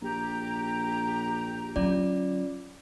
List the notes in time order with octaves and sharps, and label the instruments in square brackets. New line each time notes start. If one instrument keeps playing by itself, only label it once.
[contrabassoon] A#1 [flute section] G4 A#5
[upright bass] D3 F#3 [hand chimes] C#4 F4 D5